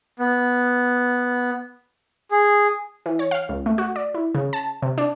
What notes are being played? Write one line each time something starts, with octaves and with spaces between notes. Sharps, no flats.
B3
G#4
E3
C#5
F5
C#2
A3
F#4
D5
E4
C#3
A5
C3
D4